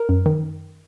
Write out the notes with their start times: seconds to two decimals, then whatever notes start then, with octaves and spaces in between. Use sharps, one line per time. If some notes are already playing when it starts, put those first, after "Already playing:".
Already playing: A#4
0.09 F#2
0.26 D#3